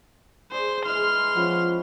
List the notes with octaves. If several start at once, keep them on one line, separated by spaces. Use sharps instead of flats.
G#4 C5 D5
E3 G#3 C6 F6
F3 B3 C#4 E4